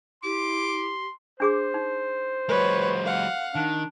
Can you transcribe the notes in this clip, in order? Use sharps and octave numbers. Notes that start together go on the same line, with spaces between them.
E4 G4 C6 D6
D4 G#4 C5 D6
D#4
F#3 G#3 B4 C#5
F5 F#5
D#3 D4